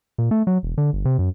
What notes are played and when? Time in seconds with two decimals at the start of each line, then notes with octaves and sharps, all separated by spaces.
0.18 A#2
0.31 A3
0.47 F#3
0.63 E1
0.78 D3
0.93 G1
1.05 C3
1.19 F#2